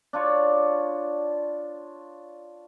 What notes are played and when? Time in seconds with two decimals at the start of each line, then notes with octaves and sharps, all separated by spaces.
0.13 D4 F4 C#5